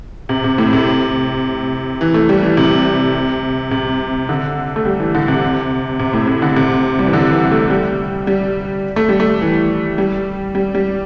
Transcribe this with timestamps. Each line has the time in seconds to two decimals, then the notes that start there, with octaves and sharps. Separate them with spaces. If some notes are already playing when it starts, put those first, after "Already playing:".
0.29 C3
0.44 C3
0.58 A2
0.73 C3
2.01 E3
2.14 A3
2.29 G3
2.43 E3
2.57 C3
3.71 C3
4.29 D3
4.76 A3
4.85 G3
5.00 E3
5.15 D3
5.28 C3
5.99 C3
6.13 A2
6.27 C3
6.42 D3
6.56 C3
6.99 G3
7.06 E3
7.13 D3
7.32 E3
7.51 A3
7.70 G3
8.27 G3
8.96 A3
9.09 G3
9.20 A3
9.41 E3
9.98 G3
10.55 G3
10.75 G3